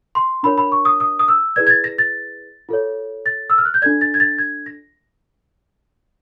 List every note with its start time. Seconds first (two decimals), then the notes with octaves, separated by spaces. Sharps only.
0.15 C6
0.43 D4 F4 A#4 C#5 B5
0.58 B5
0.72 C#6
0.85 D#6
1.00 D#6
1.19 D#6
1.28 E6
1.56 E4 G#4 B4 D5 G#6
1.67 G#6
1.70 A6
1.84 A#6
1.98 A6
2.69 F4 A4 C#5
3.26 A6
3.50 E6
3.58 F6
3.65 F#6
3.74 G6
3.82 D4 F4 A4 D5 G#6
4.01 A6
4.14 G#6
4.20 A6
4.38 G#6
4.66 A#6